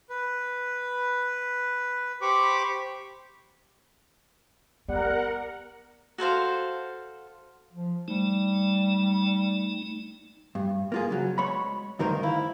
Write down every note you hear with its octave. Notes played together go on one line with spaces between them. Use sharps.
B4
G4 C5 B5 C#6 D6
G3 B3 A#4 F#5
F#4 A4 C5 F5
F3
G3 A3 D#4
G2
A#3 F4 G#4
C#3 F#3
G#3 C#5 B5
D2 G2 D#3 D#4 A#4 C5
E4 F5